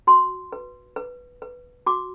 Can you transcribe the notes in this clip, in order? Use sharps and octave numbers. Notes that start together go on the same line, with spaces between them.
F#4 C6
B4
B4
B4
F#4 D6